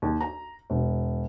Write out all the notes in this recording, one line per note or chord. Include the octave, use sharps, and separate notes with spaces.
D#2
A#5
E1